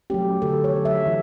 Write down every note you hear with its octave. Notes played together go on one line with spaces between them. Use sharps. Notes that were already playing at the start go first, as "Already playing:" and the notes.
F#3 A3 C#4 G4
D3 A4
C#5
F#3 C#4
E5
E3